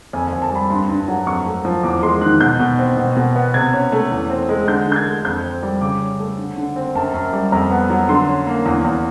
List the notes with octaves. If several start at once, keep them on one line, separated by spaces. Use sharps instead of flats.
F2 G#5
F2 G#5
A5
G3 B5
G2 C6
G2
F#3
F2 C#6
A3
F3
E2 D6
G#3 C6
D#3 F#6
B2 G6
B2
C4
B2
B2
B3
C3 G#6
C#4
A3
E2
C4
G#3
D3 G6
D3
G6
G#6
A3
F2 G6
C4
G3
C#3 D6
C#4
A3
D3
D3
C4
F#2 A5
F#2
G3
F2 A#5
B3
F#3
D3 C6
C#4
A#3
E2
E2